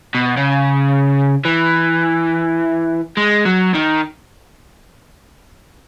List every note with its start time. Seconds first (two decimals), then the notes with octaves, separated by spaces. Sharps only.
0.14 B2
0.37 C#3
1.45 E3
3.17 G#3
3.45 F#3
3.74 D#3